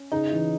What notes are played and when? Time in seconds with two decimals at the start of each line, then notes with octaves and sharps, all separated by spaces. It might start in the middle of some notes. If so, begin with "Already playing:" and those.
Already playing: C#4
0.12 C#3 D#4
0.32 E3